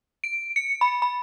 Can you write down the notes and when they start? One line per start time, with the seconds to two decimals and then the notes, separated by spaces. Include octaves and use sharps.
0.24 D7
0.56 C#7
0.81 B5
1.02 B5